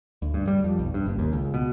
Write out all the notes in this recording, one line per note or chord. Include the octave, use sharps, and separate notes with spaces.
D2
G2
G3
F2
B1
G2
F#1
D#2
C#2
B2